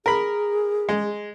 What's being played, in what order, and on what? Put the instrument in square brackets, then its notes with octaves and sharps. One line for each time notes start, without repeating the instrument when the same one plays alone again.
[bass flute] G#4 [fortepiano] A#4 B5
[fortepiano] G#3